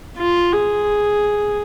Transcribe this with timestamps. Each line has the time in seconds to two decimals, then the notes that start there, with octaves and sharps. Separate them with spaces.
0.18 F4
0.53 G#4